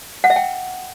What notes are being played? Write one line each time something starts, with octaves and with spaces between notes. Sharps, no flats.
F#5
E5
G5